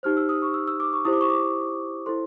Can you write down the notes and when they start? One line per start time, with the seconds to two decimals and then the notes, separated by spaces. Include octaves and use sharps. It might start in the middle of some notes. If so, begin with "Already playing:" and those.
0.03 D#4 G4 C5 F6
0.17 E6
0.29 D#6
0.42 C#6
0.54 E6
0.67 E6
0.80 D6
0.93 C#6
1.05 E4 G4 C5 D#6
1.13 D6
1.21 C#6
1.29 D6
2.06 E4 A4 C5 C6